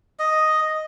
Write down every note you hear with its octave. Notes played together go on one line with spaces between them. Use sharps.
D#5